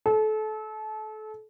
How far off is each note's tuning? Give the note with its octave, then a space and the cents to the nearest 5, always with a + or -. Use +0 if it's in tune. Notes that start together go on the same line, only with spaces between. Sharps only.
A4 -30